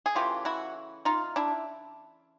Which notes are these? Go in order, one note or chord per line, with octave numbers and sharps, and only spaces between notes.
G#4
C#3 E3 A3 F4 G4
E4 F#4
D#4 F4
D4 E4